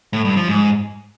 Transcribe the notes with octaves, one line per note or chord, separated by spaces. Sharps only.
A2
G2
F3
G#2